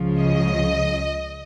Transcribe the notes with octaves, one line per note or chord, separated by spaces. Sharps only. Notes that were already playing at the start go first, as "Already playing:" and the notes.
Already playing: C#2 C#3 F3
D#5